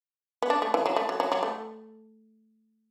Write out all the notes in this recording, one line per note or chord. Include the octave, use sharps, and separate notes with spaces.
B3
D4
A3
E3
F#3
A3
F#3
F#3
F#3
A3